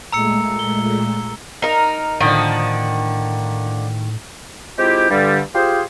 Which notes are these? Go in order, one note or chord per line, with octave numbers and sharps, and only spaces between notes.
A#2 G#3 A3 A#5 E6 C#7
G7
D#4 A#4
A2 D3 D#3 F3
G#3 C4 E4 F4 G4
G2 D3 G3
F4 G4 G#4 C5